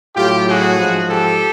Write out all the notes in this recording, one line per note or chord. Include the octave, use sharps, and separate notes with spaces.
A2 F#3 F4 G4
F#4 G#4
G#2 F3
G4 A4